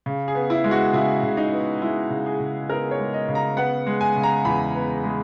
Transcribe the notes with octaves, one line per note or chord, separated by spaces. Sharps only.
C#3
G#4
B3
E4
G#3
F#4
C#3 E4
C#3
D#4
B3
G#3 E4
C#3
G#4
C#3
B3 A#4
C#5
G#3
D#5
C#3
A#5
B3 F#5
G#3
G#5
C#3
A#5
E2 B5
B3
G#3